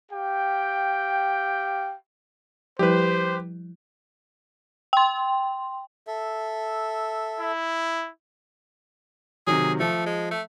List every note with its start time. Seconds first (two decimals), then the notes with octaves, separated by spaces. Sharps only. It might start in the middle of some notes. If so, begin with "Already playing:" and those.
0.11 G4 F5 G5
2.79 F3 G3 E4 G4 B4 C5
4.93 G5 C6
6.07 A4 E5
7.40 E4
9.47 C3 D#3 F#3 G#4
9.80 F3 A3
10.06 G#3
10.31 A3